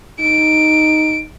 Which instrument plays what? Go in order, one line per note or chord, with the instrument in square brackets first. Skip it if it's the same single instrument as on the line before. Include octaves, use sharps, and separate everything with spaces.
[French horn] D#4 [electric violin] D7